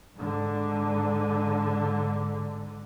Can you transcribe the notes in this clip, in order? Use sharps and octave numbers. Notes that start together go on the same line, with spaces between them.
G#2 D3